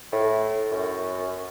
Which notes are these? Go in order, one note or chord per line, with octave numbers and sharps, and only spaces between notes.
A2
F#2